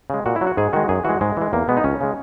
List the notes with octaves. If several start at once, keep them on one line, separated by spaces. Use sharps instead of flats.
C#3 G#3
A#2 F#4
E4
F#3
F#4
G#2 G#4
D#3 G#3 F#4
F#2 G#4
E3 G#3 F#4
G#2 G#3
E3 G#3
E2 A#3
B2 G#3 B3
D#4
C#2 C#4
C#3 G#3